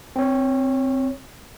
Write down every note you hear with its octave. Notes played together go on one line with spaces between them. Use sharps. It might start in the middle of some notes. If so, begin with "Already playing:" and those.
C4 C#5